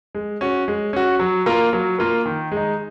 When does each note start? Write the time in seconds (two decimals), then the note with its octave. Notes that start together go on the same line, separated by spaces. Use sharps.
0.15 G#3
0.41 C#4 F#4
0.68 G#3
0.93 C#4 F#4
1.19 F#3
1.46 A#3 F4 A#4
1.73 F#3
1.98 A#3 F4 A#4
2.25 D#3
2.52 G#3
2.57 D#4